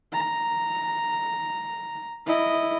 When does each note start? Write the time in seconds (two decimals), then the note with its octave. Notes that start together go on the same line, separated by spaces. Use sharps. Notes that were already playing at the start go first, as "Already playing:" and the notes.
0.13 A#5
2.26 E4 D#5